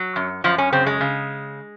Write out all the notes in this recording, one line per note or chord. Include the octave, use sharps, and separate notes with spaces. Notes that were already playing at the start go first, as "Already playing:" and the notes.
Already playing: F#3
F#2
F#2 F3
C#4
C#3 C4
G#3
C#3